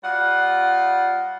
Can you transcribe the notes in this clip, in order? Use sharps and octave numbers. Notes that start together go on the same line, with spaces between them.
G3 F4 D#5 F#5